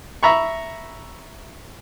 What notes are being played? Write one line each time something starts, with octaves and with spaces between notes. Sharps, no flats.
E5 A#5 B5 C#6